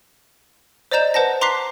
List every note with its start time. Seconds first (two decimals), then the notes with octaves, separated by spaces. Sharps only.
0.91 C5 D5 D#5 A#5 G6 E7
1.14 B4 C5 F#5 A5 A#6
1.41 A#5 C6 D6 F#6 B6 C7